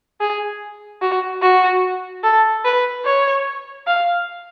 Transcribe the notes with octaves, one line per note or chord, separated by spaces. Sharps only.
G#4
F#4
F#4
A4
B4
C#5
F5